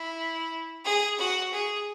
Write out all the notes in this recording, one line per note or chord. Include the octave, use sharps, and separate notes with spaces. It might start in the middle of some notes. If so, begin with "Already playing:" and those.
Already playing: E4
G#4
F#4
G#4